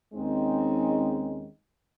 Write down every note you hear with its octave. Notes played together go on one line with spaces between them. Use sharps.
D#2 G#3 C4 C#4 D#4